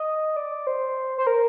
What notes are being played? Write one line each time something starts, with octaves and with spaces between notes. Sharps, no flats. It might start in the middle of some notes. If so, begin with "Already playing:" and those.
Already playing: D#5
D5
C5
C5
A#4